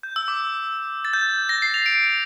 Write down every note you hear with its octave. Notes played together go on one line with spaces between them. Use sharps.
G6
E6
D6
A6
G6
A#6
C7
F7
D7